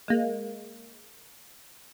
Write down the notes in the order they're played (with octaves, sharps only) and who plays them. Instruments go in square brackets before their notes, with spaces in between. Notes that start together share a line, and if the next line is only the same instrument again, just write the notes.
[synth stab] G#3 A#3